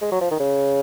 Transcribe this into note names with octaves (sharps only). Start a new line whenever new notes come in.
G#3
F#3
F3
D#3
C#3